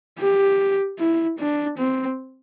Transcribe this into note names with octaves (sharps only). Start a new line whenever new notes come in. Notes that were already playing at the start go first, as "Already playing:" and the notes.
G4
E4
D4
C4